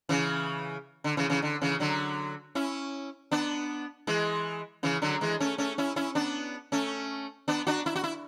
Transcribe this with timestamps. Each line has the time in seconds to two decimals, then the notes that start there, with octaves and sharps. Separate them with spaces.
0.09 C#3 E3
1.04 D3
1.17 C#3 E3
1.30 C#3 E3
1.42 D3
1.62 C#3 E3
1.80 D3 F#3
2.55 C#4 E4
3.31 B3 D4
4.07 E3 G#3
4.83 C#3 E3
5.02 D3 F#3
5.21 E3 G#3
5.40 A3 C#4
5.58 A3 C#4
5.78 C#4 E4
5.96 C#4 E4
6.15 B3 D4
6.72 A3 C#4
7.48 B3 D4
7.67 D4 F#4
7.86 E4
7.95 F#4
8.04 E4